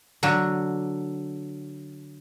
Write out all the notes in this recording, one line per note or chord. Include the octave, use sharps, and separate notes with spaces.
D3 F#3 D4